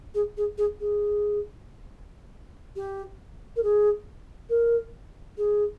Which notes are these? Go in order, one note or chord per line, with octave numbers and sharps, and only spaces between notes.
G#4
G#4
G#4
G#4
G4
A#4
G#4
A#4
G#4